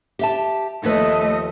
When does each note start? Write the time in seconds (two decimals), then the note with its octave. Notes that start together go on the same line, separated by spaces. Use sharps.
0.19 G4 E5 A5
0.84 D#2 F3 A3 B4 D#5